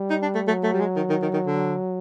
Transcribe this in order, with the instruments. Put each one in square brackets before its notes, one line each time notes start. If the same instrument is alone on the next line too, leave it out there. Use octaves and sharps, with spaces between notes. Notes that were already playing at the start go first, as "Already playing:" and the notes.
Already playing: [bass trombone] G3
[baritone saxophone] D#4
D4
A3
[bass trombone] F#3 [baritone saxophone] A3
[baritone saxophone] A3
G3
G#3
D#3
D#3
D#3
D#3
D3